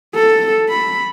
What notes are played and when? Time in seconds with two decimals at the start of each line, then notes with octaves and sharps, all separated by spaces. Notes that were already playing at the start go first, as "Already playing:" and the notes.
0.15 A4
0.70 B5